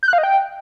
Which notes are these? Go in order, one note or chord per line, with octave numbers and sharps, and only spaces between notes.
G6
F#6
F5
D#5
G5